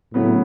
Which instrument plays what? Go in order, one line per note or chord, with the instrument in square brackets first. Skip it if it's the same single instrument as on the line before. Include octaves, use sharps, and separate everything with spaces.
[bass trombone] A2 [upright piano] C#3 F#3 B3